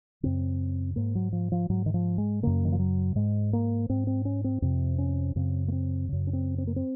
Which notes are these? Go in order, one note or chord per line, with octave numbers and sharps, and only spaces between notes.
F#2 C#3 C4
G#2 A#3
F#3
F3
F3
G#2 F#3
D#3
F3
G#3
F#2 C#3 A#3
D#3
F3
F#3
G#2 G#3
A#3
G#2 C4
C4
C#4
C4
F2 C3 C4
C#4
F#2 C#3 C4
A#3
C4
F#2 C#3
C#4
C4
C4
A#3
C4